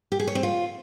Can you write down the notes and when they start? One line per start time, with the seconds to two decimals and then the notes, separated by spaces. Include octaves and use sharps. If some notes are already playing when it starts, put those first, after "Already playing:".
0.12 G4
0.20 G#4
0.27 C#5
0.35 C4
0.43 F4